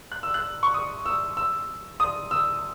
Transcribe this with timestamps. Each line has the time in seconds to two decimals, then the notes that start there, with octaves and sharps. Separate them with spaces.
0.12 F#6
0.23 E6
0.34 F#6
0.63 C#6
0.74 D#6
1.06 E6
1.37 E6
2.00 D#6
2.31 E6